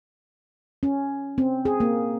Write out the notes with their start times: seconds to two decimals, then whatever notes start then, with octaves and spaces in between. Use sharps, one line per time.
0.83 C#4
1.38 C4
1.65 G#4
1.80 A#3